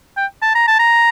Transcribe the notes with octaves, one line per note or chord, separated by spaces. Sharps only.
G5
A5
A#5
A5
A#5